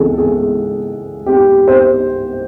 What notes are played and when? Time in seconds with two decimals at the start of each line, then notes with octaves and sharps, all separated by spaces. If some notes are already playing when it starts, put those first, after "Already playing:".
Already playing: C#2 C#3 E3 G#4 A4
0.18 G#4
1.26 G4
1.68 C5